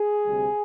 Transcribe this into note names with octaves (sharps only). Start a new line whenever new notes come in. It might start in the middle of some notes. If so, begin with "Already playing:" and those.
Already playing: G#4
D2 C3 G3